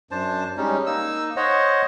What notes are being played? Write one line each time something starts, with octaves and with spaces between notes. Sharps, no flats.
F#2 D4 C5 A5
G3 G#3 C#4 D#4
A#3 D#4 E6
C5 C#5 D#5 F#5